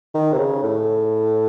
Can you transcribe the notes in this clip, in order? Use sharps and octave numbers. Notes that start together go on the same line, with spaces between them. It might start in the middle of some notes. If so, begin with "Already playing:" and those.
D#3
C3
C#3
A2